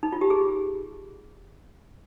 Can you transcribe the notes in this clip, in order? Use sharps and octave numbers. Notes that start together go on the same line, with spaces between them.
D#4
F4
G4
G#4